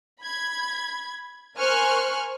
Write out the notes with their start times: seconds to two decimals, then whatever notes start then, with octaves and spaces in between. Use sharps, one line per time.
0.22 B5 G#6
1.56 A#4 C5 G#5 C#6 F6 F#6